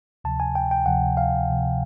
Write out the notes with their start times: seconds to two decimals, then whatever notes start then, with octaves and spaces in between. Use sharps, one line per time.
0.24 D2 C3 F3 A5
0.40 G#5
0.55 G5
0.71 G5
0.86 D2 C3 F3 F#5
1.17 F5
1.48 D2 C3 F3